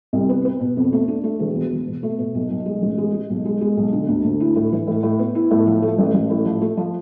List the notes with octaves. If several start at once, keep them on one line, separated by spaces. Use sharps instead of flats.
C2
B3
B3
B2
F2
A3
D4
A3
E1
E2
E1
B2
A3
B2
B1
B1
G#3
A1
G#3
G#3
B1
G#3
G#3
B1
D3
D2
D2
E4
A2
E3
A2
A2
B3
E4
A2
F3
A3
A1
A1
A2
F3
A3
F3